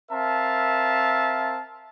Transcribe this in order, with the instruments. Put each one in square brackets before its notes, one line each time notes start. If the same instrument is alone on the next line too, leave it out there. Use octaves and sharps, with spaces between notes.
[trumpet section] C4 A#4 E5 F5 A5